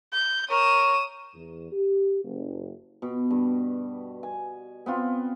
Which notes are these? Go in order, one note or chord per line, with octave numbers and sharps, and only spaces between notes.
G6
A#4 C#5 D#6 E7
E2
G4
F#1
B2
G2
G#5
B3 C4 F4